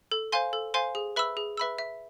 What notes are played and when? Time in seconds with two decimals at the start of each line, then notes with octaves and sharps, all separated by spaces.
0.12 A4
0.32 C5 F5 G#5 C6
0.53 A4
0.74 C5 F5 G#5 C6
0.95 G#4
1.16 B4 E5 B5 E6
1.37 G#4
1.57 B4 E5 B5 E6
1.78 E5